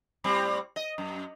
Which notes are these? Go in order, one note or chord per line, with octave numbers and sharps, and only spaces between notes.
A2 G3 C4
D#5
F#2